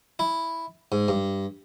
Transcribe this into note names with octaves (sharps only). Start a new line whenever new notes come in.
E4
G#2
G2